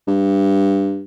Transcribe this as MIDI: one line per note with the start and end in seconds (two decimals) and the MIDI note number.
0.07 1.05 43